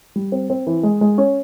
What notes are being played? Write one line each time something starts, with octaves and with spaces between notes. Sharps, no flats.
G3
C4
C4
E3
G#3
G#3
C#4